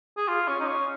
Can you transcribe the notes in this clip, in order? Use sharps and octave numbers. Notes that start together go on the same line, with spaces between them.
G#4
F4
C#4
D#4
C#4